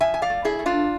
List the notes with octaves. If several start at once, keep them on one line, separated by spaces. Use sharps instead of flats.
F3 E5 G#5
G#5
D5 F5
A3
E4 G#4
A3
D4 F4